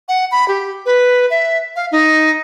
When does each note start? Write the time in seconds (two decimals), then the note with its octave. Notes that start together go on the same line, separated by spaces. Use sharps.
0.09 F#5
0.32 B5
0.48 G4
0.86 B4
1.30 E5
1.76 F5
1.92 D#4